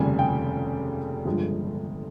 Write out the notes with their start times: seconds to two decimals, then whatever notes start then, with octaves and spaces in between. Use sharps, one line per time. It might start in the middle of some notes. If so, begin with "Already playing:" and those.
Already playing: F1 D#2 C#3 G3 G#5
0.19 G5
1.25 G1 G2 F3 G#3